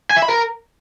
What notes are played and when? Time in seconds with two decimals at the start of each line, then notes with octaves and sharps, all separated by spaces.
0.10 G#5
0.16 E5
0.22 B5
0.28 A#4